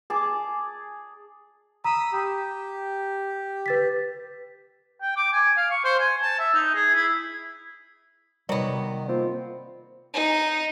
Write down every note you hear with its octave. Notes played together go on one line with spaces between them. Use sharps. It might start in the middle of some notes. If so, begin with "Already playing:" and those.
G#4 A5 D6
A#5 B5 D#6 E6
G4
B4 A6 B6
G5
D6
G#5
F5
C#6
C5
G#5
A5
E5
D#4
G#4
E4
C3 D#3 F#3 G3 B3 D5
A#3 C4 F4
D#4